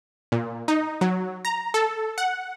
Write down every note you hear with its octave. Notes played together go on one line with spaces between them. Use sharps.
A#2
D#4
F#3
A#5
A4
F#5